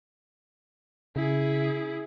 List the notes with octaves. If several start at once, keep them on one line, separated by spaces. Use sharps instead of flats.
C#3 E4 G#4